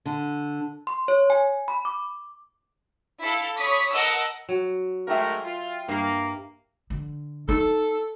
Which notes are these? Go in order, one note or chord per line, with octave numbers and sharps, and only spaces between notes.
D3
C6
C#5
G#5
B5
D6
E4 A4 F5
C#5 B5 D6 D#6 B6
A#4 D#5 F#5 A5 D#6 E6
F#3
G#2 A3 A#4 E5 G5
F4
G2 A#3
D3
D#4 A4